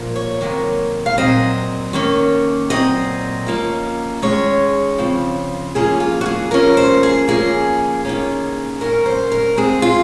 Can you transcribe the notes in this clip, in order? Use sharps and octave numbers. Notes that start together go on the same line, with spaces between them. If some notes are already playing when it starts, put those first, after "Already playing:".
Already playing: A#2 F3 A#3
C#5
C3 D#3 F#3 A#3
F5
A#2 F#3 C4 D#5
D#3 A#3 C#4
A#2 F#3 C4 D#5
F3 A#3 C#4
D#3 G#3 C#4 C#5
C#3 F3 C4
F3 A#3 C#4 G#4
F4
F#4
G#4
F3 A#3 C#4 A#4
C5
G#4
F3 A#3 C#4 G#4
D#3 A#3 C#4
A#2 F#3 C#4 A#4
C5
A#4
C#3 G#3 C4 G#4
F4